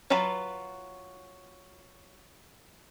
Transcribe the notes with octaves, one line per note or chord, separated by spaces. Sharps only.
F#3 F4 B4 A5 B5